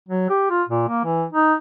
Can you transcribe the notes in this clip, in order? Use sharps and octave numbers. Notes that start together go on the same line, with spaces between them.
F#3
G4
F4
A#2
A#3
E3
D#4